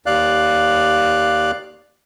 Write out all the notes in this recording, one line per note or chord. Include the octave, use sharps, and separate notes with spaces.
D#2 D5 F5 F#6